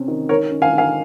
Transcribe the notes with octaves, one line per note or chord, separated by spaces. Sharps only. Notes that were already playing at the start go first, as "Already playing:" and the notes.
Already playing: C3 C4 C#4
D#3
D#3 A#4 C#5
C#4
F5 G#5
D#3
F5 G#5